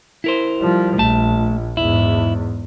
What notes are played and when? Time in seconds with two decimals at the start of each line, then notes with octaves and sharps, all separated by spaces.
0.24 E4 A#4 C5
0.58 F3 G3
0.98 A#1 A3 A5
1.77 E2 G#2 E4